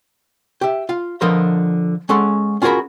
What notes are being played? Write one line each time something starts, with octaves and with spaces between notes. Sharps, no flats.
G4 E5
F4 F5
D3 F3 A#4 B4 D#5 C6
G#3 C#4 A4 F#5 C6
C#4 F4 F#4 G#4 A#4 B5